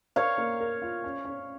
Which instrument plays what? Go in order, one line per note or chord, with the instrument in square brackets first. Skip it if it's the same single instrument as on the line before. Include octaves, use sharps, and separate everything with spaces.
[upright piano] A#4 [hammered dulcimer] C#5 F5
[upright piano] A#3
A#4
F4
C#4
C#4